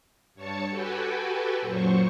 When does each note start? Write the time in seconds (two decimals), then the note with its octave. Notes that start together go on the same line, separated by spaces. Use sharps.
0.35 G2 C#5 A5 C#7
0.70 F#4 G4 A4 B4 G5 G#5
1.60 F#2 A#2 F#3 C5 C#6